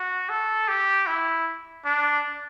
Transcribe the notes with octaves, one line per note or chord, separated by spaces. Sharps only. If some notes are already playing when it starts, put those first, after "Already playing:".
Already playing: F#4
A4
G4
E4
D4